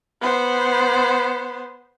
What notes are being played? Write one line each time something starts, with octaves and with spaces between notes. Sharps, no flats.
B3 C5